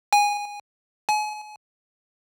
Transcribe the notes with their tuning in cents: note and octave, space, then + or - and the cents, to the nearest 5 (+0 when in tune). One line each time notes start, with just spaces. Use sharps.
G#5 -15
G#5 +35